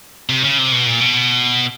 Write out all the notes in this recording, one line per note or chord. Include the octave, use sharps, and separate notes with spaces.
C3
C#3
C3
B2
A#2
B2